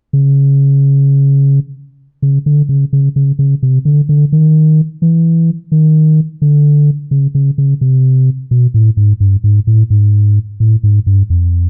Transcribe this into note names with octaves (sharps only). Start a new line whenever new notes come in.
C#3
C#3
D3
C#3
C#3
C#3
C#3
C3
D3
D3
D#3
E3
D#3
D3
C#3
C#3
C#3
C3
B2
A2
G#2
G2
G#2
A2
G#2
A2
G#2
G2
F2